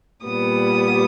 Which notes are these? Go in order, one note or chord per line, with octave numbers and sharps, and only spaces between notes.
A#2 G3 B3 D#6